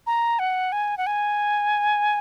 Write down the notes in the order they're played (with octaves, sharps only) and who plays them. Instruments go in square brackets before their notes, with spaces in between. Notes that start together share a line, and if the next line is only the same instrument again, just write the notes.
[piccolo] A#5
F#5
G#5
F#5
G#5